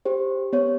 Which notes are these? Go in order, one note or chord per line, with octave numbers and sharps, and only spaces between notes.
G4 C5
B3 C#5